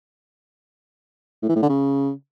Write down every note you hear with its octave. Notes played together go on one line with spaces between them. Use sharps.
A2
E3
A2
D3
C#3